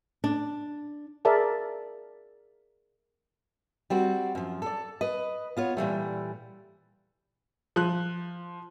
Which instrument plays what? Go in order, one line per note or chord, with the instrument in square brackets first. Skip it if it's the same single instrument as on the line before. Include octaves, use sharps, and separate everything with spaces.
[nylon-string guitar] D4
[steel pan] G#4 A#4 D5 E5 A5
[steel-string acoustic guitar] G3 C4 F#4
F#2 F3
A4 D5
B4 D#5
B3 F4 C#5
A#2 E3 G3 A3
[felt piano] F3 F#6